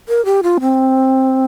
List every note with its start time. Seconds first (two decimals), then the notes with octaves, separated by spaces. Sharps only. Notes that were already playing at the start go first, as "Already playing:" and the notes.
0.08 A#4
0.25 G4
0.43 F4
0.60 C4